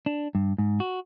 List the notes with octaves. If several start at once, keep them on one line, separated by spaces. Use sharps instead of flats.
D4
G2
G#2
F#4